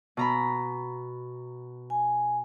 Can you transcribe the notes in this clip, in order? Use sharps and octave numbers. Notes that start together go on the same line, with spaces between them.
B2 A#5 B5
G#5